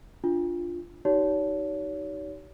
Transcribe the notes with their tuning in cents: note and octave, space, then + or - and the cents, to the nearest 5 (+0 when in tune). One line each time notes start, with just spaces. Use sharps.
D4 +0 F4 +0
D#4 +5 G4 -40 C#5 +40